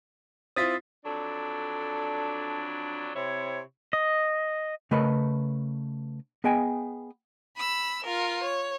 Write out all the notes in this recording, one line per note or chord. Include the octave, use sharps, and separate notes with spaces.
C4 E4 F4 D#6 A6 B6
F2 F#3 D4 A4
C3 C4 E4 C#5
D#5
C#3 A3 A#4 B4 D#5 B5
B3 G#4 D#5 G5 G#5
B5 E6
F4 A#4
C#5